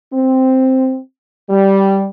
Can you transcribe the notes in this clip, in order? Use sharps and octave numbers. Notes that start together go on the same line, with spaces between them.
C4
G3